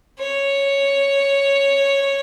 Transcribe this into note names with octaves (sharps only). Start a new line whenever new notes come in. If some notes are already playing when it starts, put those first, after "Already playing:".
C#5